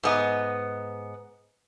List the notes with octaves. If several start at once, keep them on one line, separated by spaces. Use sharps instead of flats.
G#2 B3 D#5